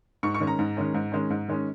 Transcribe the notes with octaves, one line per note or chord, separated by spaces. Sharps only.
G#2 C#6
C#6
D#3 G#3 C#4
A#5
G#2
D#3 G#3 C#4
G#2
D#3 G#3 C#4
G#2
D#3 G#3 C#4